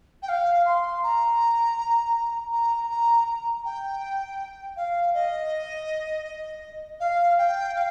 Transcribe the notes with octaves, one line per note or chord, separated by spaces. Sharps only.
G5
F5
C6
A#5
A#5
A#5
A#5
G5
F5
D#5
F5
G5
F5